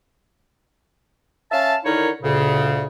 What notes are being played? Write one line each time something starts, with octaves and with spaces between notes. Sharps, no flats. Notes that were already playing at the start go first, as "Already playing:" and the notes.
C#4 E5 F5 A5
D3 D#3 D#4 E4 A#4 C#5
D2 A#2 C#3